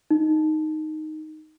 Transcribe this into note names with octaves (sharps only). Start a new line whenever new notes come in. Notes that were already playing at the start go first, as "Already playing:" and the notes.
D#4